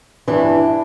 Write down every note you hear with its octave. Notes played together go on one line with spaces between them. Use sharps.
G2 E3 D4